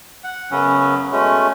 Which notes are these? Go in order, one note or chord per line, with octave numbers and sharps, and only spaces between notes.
F#5
F#2 C#3 F#3 B3 C#4
B2 G#3 A3 C#4